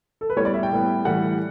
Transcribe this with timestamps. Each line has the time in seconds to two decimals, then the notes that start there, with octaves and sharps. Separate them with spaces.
0.21 A4
0.30 B4
0.36 A2 G3 B3 C#5
0.45 D5
0.54 E5
0.63 G5
0.71 A2 G3 B3
1.05 A2 E3 G3 F#5